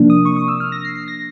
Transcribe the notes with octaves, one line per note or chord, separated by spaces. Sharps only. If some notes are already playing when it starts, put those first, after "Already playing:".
Already playing: C3 F3 A#3 D4
D#6
C#6
D#6
E6
F6
A#6
C7
C7
A#6